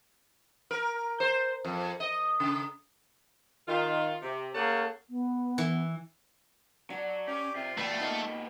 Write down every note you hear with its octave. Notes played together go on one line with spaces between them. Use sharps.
A#4
C5
F2
D#5
C#3
D#3 F4
C3
A3 A#3 C#4 G#4 F#5 A5
B3
E3
F#3 D4
C#4 G4
C3 F4
A#2 E3 A3 D4 B4 G5
A#3 B3 D#4